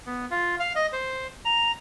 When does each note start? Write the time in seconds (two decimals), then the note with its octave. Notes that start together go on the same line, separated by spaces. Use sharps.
0.07 B3
0.31 F4
0.60 F5
0.76 D#5
0.93 C5
1.45 A#5